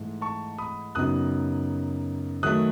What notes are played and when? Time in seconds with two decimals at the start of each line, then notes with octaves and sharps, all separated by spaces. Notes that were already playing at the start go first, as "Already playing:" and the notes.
Already playing: G#2 E3 A3
0.21 A5 C#6
0.58 B5 D#6
0.95 F#2 C#3 F#3 B3 D#4 D#6 F#6
2.43 D#3 F#3 A3 D#6 F#6